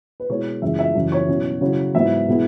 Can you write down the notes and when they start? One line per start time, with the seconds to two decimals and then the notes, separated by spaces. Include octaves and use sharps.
0.20 B4
0.29 B2 G#3 E4 C#5
0.62 F#2 C#3 E3 G#3 E5
0.79 E5
0.95 F#2 C#3 E3
1.12 C#5
1.28 B2 F#3 C#4 E4
1.61 C#3 F#3 C#4 E4
1.94 G#2 F#3 B3 E4 E5
2.29 B2 G#3 B3 E4